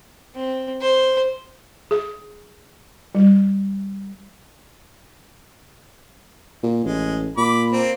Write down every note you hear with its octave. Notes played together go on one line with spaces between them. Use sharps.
C4
C5
G#4
G3
A#2
A1 G#3
A#2 B5 D6
A#3 C4